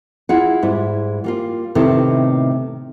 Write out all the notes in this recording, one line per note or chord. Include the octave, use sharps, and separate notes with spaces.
E4 F4 G#4 F#5
G#2 G3 E4
G3 A#3 F4
A2 C3 D#3 B3 E4 A4